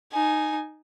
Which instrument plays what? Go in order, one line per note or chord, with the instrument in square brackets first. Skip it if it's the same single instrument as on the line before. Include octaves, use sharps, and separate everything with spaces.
[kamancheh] D#4 G#5